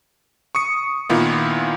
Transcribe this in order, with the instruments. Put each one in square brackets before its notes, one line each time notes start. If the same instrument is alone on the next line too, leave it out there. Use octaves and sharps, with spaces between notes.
[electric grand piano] C#6 D#6 C#7
A#2 D#3 B3 E4 F4